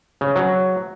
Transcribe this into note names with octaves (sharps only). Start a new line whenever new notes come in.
C#3
F#3